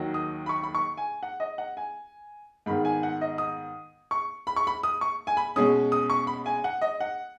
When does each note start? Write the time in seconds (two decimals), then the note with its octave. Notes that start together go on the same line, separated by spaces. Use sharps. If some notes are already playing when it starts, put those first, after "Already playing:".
Already playing: D#2 D#3 F#3
0.14 D#6
0.46 B5
0.49 C#6
0.63 B5
0.75 C#6
0.97 G#5
1.23 F#5
1.40 D#5
1.58 F#5
1.77 G#5
2.66 G#2 D#3 B3 B5
2.85 G#5
3.03 F#5
3.21 D#5
3.38 D#6
4.11 C#6
4.47 B5
4.56 C#6
4.67 B5
4.83 D#6
5.01 C#6
5.27 G#5
5.37 B5
5.56 B2 G#3 C#4 D#6
5.92 D#6
6.10 C#6
6.27 B5
6.46 G#5
6.64 F#5
6.81 D#5
7.00 F#5